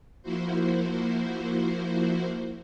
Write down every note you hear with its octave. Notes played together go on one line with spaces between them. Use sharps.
F3 A#3 E4 F#4 C5